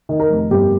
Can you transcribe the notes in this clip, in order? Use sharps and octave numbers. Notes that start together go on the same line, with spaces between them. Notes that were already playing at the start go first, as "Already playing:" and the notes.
D#3
A#4
F1
G1 G4